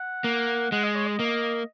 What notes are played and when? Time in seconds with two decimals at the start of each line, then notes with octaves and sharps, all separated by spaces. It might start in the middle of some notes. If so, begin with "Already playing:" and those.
Already playing: F#5
0.24 A#3
0.72 G#3 F#5
0.84 D#5
0.95 C#5
1.07 D#5
1.19 A#3